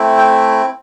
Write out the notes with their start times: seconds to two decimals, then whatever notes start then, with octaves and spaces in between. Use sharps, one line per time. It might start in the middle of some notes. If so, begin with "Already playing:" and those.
Already playing: A3 C4 E4
0.18 G5